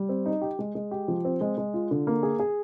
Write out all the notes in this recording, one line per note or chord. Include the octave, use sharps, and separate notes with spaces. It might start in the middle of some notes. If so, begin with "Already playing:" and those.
Already playing: G3
C4
D#4
G4
G#3
G#3
G4
F3
C4
G#3
G#3
F4
D3
A#3
G#4
G#4